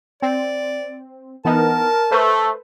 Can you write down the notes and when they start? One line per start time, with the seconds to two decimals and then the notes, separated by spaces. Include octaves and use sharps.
0.22 C4 D5
1.45 E3 B3 D#4 A#4 A5
2.11 A3 A4 B4 C5